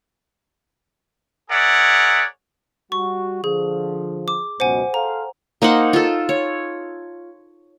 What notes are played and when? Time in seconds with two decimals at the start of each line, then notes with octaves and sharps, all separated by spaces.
1.50 G#4 A#4 C#5 D5 E5 F#5
2.92 G3 F#4 C#6
3.44 D3 F3 G#4
4.28 D6
4.60 C#2 F#2 B2 C5 F#5 G#5
4.94 A4 C5 F5 A#5
5.62 A#3 D#4 C5 F#5
5.93 F4 A4
6.29 C#5